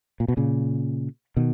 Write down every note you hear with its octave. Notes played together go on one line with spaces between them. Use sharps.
A#2
B2
A#2 C#3
B2 D#3